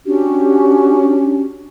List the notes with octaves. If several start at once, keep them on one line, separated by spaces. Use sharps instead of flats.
C#4 D4 F#4 G4